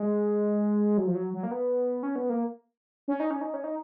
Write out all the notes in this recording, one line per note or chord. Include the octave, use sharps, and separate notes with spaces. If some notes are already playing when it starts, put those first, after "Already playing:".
Already playing: G#3
F#3
F3
F#3
F#3
A#3
B3
C#4
B3
A#3
C#4
D#4
C#4
D#4
C#4
D#4